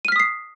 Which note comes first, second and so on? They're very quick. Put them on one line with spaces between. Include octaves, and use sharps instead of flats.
D#7 F6 B6 D#6 C7